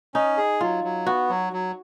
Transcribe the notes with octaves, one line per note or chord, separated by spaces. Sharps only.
C#4 D#4
G#4
F#3 F4
F#3
B3 F#4
F#3
F#3